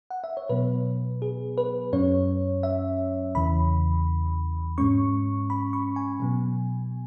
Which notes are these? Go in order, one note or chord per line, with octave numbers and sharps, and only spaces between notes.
F#5
E5
C#5
B2 F#3 B3 B4
G#4
B4
F#2 F#3 C#4 C#5
E5
E2 C#3 E3 B5
G#2 G#3 C#4 C#6
B5
C#6
G#5
B2 F#3 B3